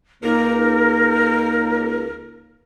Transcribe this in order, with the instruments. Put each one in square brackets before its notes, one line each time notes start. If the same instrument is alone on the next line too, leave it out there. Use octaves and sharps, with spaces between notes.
[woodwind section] C#2 A#3 D#4 [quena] A#4